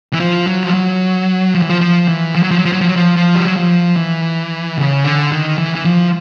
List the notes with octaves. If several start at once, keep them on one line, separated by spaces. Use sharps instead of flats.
E3
F3
F#3
F3
F#3
F3
E3
F3
F3
E3
F3
F#3
F3
F#3
F3
F#3
F3
F#3
F3
F3
G3
F#3
F3
E3
C#3
D3
D#3
E3
E3
F3